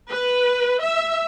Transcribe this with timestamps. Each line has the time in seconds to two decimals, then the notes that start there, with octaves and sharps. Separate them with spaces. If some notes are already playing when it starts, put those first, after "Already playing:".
0.10 B4
0.82 E5